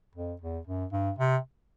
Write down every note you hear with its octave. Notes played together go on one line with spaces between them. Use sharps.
F2
E2
F#2
G2
C3